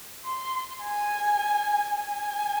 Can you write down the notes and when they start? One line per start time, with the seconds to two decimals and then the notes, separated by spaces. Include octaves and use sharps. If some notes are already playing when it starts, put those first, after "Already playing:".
0.25 C6
0.83 G#5
2.00 G#5